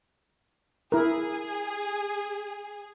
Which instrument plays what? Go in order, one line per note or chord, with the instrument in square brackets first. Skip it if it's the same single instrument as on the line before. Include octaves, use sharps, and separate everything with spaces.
[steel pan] E4 A#4 [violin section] G#4